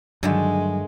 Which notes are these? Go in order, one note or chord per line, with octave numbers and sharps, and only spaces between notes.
G2 D3 D#3 F#3 G#3 A3